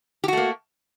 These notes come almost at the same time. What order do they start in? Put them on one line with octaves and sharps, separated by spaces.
G4 F#4 A3 A#3